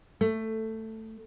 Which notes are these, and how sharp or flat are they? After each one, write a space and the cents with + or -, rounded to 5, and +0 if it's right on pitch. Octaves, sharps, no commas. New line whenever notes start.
A3 +10